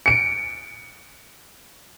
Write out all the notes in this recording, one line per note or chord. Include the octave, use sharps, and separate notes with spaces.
C#7 D7